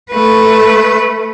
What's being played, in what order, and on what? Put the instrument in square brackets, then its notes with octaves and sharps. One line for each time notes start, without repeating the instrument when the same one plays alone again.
[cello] A3 B4